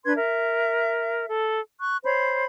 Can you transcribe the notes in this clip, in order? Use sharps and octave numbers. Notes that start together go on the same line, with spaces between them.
D4 B4 C6 G#6
A#4 E5
A4
C#6 F#6
C5 C#5 B5